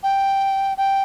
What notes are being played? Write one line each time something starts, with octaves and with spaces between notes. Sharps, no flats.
G5
G5